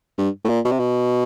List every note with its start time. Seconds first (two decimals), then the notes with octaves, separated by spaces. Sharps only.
0.18 G2
0.45 A2
0.49 A#2
0.65 B2
0.72 C3
0.79 B2